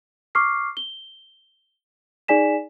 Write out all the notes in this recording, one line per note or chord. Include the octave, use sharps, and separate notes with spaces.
C#6 D6 F6 C7
G7
D#4 G#4 D5 G#5 B6 E7